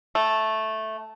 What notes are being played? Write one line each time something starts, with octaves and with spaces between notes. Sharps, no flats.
A3